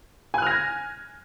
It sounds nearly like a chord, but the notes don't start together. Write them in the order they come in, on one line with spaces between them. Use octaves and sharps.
G#5 F#6 F6 A#6 G#6